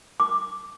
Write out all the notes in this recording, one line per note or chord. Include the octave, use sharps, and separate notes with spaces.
D6